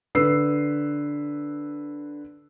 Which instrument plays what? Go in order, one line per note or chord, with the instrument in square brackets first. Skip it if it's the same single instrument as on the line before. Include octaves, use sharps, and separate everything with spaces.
[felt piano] D3 B4 E6 C7